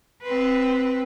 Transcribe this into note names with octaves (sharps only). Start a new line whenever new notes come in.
C4 B4